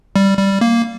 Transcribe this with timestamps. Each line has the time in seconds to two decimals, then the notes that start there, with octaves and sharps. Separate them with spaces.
0.16 G3
0.38 G3
0.61 A#3